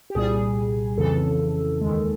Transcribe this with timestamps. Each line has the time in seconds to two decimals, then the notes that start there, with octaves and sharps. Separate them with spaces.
0.10 G4
0.15 C2 A#2 G3 G#4
0.98 F2 C#3 E3 A4
1.81 D#2 D#3 G#3